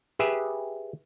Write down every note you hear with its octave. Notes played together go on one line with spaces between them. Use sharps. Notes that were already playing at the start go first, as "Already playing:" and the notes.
G4 G#4 B4 E5